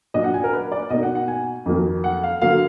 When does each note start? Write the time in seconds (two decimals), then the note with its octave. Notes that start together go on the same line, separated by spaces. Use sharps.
0.14 A#2 F#3 D4 D#5
0.24 F#5
0.34 G#5
0.44 A#4
0.53 B4
0.72 D5
0.90 B2 A#3 D#4 D#5
1.03 F#5
1.15 F#5
1.28 G#5
1.66 F2 D#3 F#3 A#3
2.04 F#5
2.23 F5
2.42 D3 F#3 A#3 F5